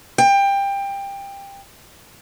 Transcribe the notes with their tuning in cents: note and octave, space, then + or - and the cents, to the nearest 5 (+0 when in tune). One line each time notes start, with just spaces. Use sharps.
G5 +20